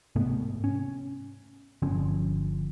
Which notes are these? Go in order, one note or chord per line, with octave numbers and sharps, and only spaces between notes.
G#2 C3 A3 B3
C#4
G1 D3 F3 C#4